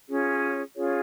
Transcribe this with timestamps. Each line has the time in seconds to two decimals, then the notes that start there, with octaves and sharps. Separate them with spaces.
0.09 C#4 F4 G#4 C#5
0.76 C#4 F4 G#4 C#5